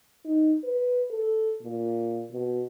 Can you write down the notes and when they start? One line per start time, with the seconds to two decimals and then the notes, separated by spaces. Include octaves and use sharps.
0.25 D#4
0.64 B4
1.10 A4
1.61 A#2
2.31 B2